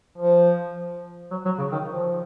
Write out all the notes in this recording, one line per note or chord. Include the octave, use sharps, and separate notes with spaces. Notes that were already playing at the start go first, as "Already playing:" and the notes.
F3
F#3
F#3
C#3
D#3
F3